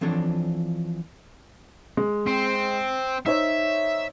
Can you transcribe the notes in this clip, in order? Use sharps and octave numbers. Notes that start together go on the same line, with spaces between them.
E3 F3 C4 D4 A4 C#5
G#3
C4
D#4 C5 C#5 E5